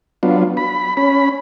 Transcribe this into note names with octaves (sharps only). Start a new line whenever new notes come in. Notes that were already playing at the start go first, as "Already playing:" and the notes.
F#3 B3 D4 F4
B5
C#4 B5